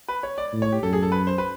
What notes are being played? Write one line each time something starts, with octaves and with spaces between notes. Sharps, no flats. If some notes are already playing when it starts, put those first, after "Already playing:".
B4
C#5
D5
A2
C#5
G4
F#2 A4
G#4
A4
B4
C5
B4